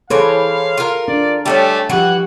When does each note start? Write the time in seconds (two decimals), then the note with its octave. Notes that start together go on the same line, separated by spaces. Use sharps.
0.10 E3 G#4 A4 C5 C#5 F5
0.78 F4 A#4
1.08 D4 D5
1.46 G3 A3 B3 C#4
1.90 E3 F3 F#4 G4 F#5